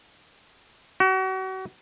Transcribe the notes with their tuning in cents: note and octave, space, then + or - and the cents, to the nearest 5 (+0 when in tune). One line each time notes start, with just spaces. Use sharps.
F#4 +35